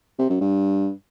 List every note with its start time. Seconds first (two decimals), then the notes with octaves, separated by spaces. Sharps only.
0.19 C3
0.30 F#2
0.41 G2